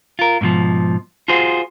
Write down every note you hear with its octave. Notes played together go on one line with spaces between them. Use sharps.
F4 A#4
G#2 B2 D3 F3
F4 F#4 G#4 C5